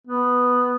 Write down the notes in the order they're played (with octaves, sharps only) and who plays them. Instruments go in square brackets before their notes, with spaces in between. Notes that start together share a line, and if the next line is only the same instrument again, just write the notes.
[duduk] B3